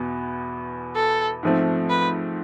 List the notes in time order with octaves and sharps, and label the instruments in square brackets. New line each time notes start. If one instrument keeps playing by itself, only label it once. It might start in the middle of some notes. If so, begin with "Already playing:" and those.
Already playing: [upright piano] E2 B2 B3
[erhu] A4
[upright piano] G#2 F3 A3 C4
[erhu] B4